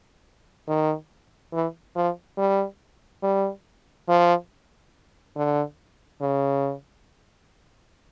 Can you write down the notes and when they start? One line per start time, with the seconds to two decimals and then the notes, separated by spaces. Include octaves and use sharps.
0.68 D#3
1.53 E3
1.96 F3
2.38 G3
3.23 G3
4.09 F3
5.36 D3
6.21 C#3